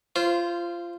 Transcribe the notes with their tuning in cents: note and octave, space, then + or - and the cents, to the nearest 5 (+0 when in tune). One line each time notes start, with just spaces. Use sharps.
F4 -20 C5 +0